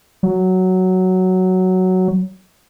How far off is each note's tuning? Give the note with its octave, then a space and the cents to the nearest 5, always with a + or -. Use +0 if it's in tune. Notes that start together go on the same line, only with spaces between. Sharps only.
F#3 +5